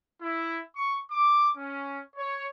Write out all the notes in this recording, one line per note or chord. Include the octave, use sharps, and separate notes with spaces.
E4
C#6
D6
C#4
C#5